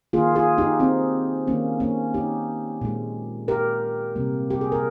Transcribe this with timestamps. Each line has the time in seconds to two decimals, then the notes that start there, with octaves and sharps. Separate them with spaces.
0.13 D#3 A#3 F4 G#4
0.35 F4 G#4
0.58 D#4 G4
0.80 C4 D#4
1.47 D#3 A#3 C#4
1.80 A#3 C#4
2.14 D#4 G4
2.81 A#2 G#3
3.48 G4 A#4
4.15 C3 G3 A#3
4.50 G4
4.61 G#4
4.72 A#4